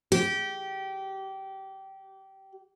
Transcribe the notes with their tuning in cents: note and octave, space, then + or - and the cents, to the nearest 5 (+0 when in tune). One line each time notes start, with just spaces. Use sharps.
G4 -20